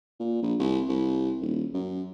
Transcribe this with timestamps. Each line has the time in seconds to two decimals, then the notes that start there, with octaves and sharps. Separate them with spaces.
0.20 A#2
0.42 A#1
0.59 C2
0.89 C2
1.41 D#1
1.74 F#2